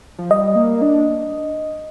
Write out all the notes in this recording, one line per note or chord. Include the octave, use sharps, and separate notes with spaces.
F3
G3 D#5
A#3
D4